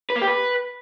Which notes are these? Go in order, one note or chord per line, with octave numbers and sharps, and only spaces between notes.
B4
A#3
G4
B4